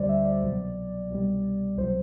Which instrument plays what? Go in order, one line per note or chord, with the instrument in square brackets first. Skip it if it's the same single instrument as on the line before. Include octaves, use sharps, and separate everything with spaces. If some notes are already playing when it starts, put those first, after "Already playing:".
Already playing: [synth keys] D2 D3 G3 C5 D5
E5
D5
C2 B2 F#3
C2 B2 G3
C2 B2 F#3 C5